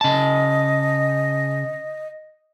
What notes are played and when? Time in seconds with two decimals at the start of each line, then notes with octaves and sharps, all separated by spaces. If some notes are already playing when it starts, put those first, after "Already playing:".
0.01 C#3 D#5 A5